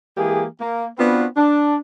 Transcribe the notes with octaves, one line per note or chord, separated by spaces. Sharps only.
E3 G#3 A#3 G4 G#4
A#3
B3 C4 D4 F4 F#4 B4
D4